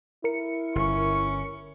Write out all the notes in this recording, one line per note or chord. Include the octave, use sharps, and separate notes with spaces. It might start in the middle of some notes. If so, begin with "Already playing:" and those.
E4 A#4 C#7
G1 C#4 C#6